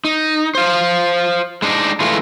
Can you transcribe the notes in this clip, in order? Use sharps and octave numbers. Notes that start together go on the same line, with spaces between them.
D#4
C5 F5
G#3 D4 D#4
E3 G#3 A3 F4